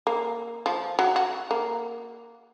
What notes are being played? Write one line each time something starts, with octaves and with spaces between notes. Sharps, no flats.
A#3
F3
F#3
F#4
A#3